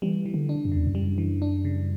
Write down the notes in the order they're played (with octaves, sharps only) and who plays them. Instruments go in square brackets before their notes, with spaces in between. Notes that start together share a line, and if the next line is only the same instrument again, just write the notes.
[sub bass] E3 [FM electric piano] G3
[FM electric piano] E3
[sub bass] D3
[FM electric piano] D4
[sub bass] F#2
[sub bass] E2 [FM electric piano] C#3
[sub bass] F#2
[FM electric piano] G3
E3
D4
C#3